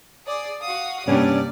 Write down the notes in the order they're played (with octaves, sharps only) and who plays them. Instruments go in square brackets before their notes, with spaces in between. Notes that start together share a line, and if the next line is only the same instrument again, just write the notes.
[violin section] G#4 D5 D#6
F#4 F5 D#6
[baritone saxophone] G2 [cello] C3 A#3 [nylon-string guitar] C#4 [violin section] D5